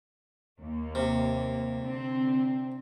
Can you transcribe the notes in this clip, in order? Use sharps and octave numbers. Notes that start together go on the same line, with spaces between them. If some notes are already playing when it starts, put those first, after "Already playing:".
D#2 A#3
C3
D3 C4